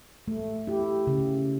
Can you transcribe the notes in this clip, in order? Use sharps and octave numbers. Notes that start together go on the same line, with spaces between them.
A3
E4 G4
C#3